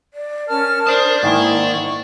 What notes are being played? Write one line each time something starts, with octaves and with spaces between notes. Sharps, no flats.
D5
C#4 A#4 A5 F6
C5 D5 A5 D#6
G#2 D#3 A#3 E4 C#6